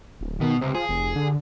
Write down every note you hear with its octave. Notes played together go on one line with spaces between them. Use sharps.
D1
B2 D#3
C#2 C3
F3 G#4
F1
D3